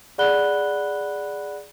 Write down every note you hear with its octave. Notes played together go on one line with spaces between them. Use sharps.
G#4 D5 F#5 B5 F#6 G7